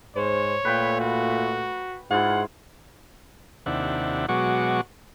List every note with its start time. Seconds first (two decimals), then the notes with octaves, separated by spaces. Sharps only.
0.16 G#2 C5 C#5
0.65 A#2 A3 B4 G5 B5
1.00 F#4
2.11 G#2 E4 F4 G#4 F#5
3.66 D#2 C3 D4 E4 F#5
4.29 B2 F#3 G#3 F#4 C#6 D6